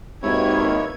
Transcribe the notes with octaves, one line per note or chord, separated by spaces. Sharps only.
G#1 D#2 A#3 E4 B4 C#5 G#6